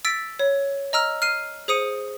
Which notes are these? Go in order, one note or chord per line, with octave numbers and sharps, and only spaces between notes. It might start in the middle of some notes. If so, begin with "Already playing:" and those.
E6 A6 B6 D7
C#5
D#5 A#5 E6 F6
F6 C7 D#7
G#4 C5 D#6 C#7 D#7